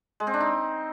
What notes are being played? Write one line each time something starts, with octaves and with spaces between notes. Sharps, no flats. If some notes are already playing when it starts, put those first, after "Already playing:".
G#3
C4
D4
D#4